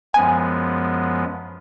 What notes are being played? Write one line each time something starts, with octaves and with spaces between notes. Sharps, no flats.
F#2 F3 G#3 B3 G#5